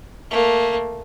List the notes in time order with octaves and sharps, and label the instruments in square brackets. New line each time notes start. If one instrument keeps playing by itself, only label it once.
[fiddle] A3 A#3